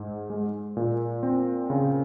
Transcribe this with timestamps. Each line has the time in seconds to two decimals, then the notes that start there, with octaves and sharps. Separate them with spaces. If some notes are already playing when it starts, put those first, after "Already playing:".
Already playing: G#2
0.30 G#3
0.77 A#2
1.23 C4
1.70 C#3